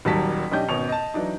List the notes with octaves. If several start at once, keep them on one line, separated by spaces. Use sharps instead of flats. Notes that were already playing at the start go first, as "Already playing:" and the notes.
D#1 D#2 F#3 G3 A5 B6
B1 C#4 D4 G4 D#5 G6
G#1 B2 C#4 C#6 F7
D#5 A5
E3 F#3 D4 D#4